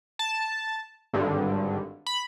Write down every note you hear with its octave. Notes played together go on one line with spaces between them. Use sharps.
A5
G#1 G2 D3
B5